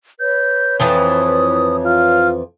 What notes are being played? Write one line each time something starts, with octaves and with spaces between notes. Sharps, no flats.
B4 C#5 G6
F2 E3 F3 D#6
F4 F6